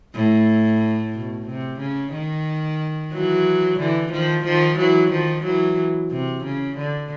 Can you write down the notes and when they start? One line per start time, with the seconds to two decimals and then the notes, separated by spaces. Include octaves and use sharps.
0.14 A2
1.14 B2
1.46 C3
1.80 C#3
2.13 D#3
3.12 E3 F#3
3.79 D3 E3
4.11 D#3 F3
4.45 D#3 F3
4.78 E3 F#3
5.11 D#3 F3
5.44 E3 F#3
6.11 C3
6.44 C#3
6.78 D3